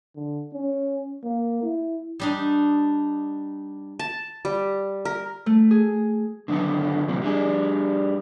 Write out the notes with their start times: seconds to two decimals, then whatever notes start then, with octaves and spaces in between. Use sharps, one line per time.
0.16 D3
0.54 C#4
1.24 A#3
1.63 E4
2.20 G3 D4 D#4
3.99 A5
4.45 G3
5.05 A#4
5.46 A3
5.71 G#4
6.48 D3 D#3 F#3 B3 A4
7.08 E2 A2 C3 E3 F#3
7.22 G3 D4 G#4